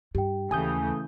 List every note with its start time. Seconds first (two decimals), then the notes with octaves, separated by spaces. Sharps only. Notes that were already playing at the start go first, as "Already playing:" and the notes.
0.15 G2 G4 G5
0.51 D#2 C#3 E3 A3 G#5 D#6 G6